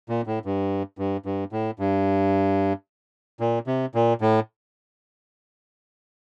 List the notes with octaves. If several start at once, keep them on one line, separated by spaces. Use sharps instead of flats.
A#2
A2
G2
G2
G2
A2
G2
A#2
C3
A#2
A2